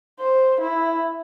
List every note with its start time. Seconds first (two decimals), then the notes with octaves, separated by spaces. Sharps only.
0.20 C5
0.61 E4